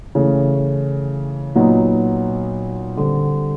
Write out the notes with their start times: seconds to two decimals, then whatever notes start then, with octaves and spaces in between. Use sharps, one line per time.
0.15 C#3 E3 A3
1.55 A#2 F#3 B3 D#4
2.97 D3 G3 C4